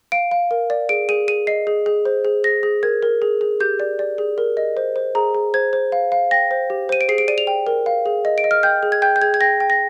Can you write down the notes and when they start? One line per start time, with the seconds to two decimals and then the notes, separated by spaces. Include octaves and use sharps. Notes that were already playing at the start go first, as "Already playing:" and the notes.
0.12 F5 D7
0.31 F5
0.51 A#4
0.70 D5
0.89 G#4 D7
1.09 G#4 D#7
1.28 G#4 D#7
1.47 D#5 C7
1.67 G#4
1.86 G#4
2.05 C5
2.25 G#4
2.44 G#4 A#6
2.63 G#4
2.83 A#4 G#6
3.03 A#4
3.22 G#4
3.41 G#4
3.60 G4 G6
3.80 D5
3.99 D5
4.18 G#4
4.38 A#4
4.57 D#5
4.77 C5
4.96 C5
5.15 G#4 A#5
5.35 G#4
5.54 C5 G#6
5.73 C5
5.92 F5
6.12 F5
6.31 G5 A#6
6.51 C5
6.70 G4
6.89 C5 D#7
7.01 D7
7.09 G#4 C7
7.18 D7
7.28 D5 D#7
7.38 F7
7.47 G5
7.67 A#4
7.86 F5
8.06 G#4
8.25 D#5
8.38 D7
8.44 D#5
8.51 F6
8.63 G5 G6
8.83 G#4
8.92 G#6
9.02 G5 G6
9.16 G6
9.22 G#4 G#6
9.34 G#6
9.41 G5 A#6
9.60 G5
9.70 A#6